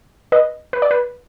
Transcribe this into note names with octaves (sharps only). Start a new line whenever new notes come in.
B4 D#5
B4
D5
B4